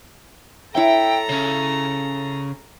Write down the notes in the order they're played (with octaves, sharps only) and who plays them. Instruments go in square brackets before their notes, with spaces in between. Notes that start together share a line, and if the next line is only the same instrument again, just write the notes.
[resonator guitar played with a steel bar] E4 C#5 E5 [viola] A4 A#5 [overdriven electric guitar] G5
[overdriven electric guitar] C#3 C#4